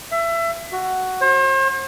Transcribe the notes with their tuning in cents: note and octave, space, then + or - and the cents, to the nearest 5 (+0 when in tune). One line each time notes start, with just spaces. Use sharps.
E5 +25
F#4 +5
C5 +40